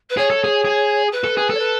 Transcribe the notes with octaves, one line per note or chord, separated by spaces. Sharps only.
B4
G#4 C#5
A4
G#4
G#4
B4
A4
G#4
A4 C#5
B4